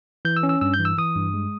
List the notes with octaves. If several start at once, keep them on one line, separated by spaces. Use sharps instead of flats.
E3 G6
E6
C#4
E6
G2 E6
G6
E3
E6
E3 D#6
G2
G#3